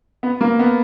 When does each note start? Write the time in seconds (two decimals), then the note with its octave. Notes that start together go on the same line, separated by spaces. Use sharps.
0.23 B3
0.41 A#3
0.59 B3